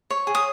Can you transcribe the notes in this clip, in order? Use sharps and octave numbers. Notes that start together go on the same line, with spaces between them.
C#5
G#4
D#6